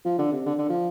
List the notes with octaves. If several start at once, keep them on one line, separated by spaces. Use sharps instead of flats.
F3
D3
C3
D3
D3
F3